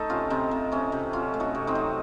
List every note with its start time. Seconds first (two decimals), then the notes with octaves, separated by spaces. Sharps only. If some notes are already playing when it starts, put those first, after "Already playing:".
Already playing: A3 D#4 A4
0.10 C3 C#4 F4
0.30 C3 C4 D#4
0.51 C3
0.72 C3 C#4
0.92 C3
1.13 F#3 C#4 F4
1.34 A3
1.40 D#4 F#4
1.55 C3
1.67 C4 D#4
1.75 F#3